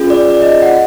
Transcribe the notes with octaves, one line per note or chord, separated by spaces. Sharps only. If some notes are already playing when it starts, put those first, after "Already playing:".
Already playing: C#4 F4 G#4
D5
D5
D#5
F#5